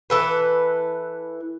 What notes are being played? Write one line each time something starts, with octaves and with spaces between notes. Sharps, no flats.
E3 A4 B4